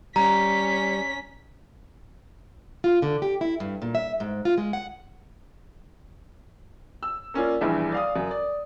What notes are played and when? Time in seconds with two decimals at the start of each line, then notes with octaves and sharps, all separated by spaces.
0.16 G3 C#4 A#5 B6
2.84 F4
3.02 D3
3.22 G4
3.41 E4
3.60 G2
3.82 A#2
3.95 E5
4.20 G#2
4.45 F4
4.58 G#3
4.73 F#5
7.03 E6
7.34 A#3 C#4 F4 D5
7.61 A#1 E2 G2 E3 G#4 E5
7.92 D5 F5 D#6
8.16 F#2
8.31 D5